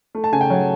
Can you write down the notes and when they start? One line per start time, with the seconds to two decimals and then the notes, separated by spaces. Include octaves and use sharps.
0.15 A3
0.24 A5
0.32 C#3 G#5
0.41 G5
0.50 F#3 C#5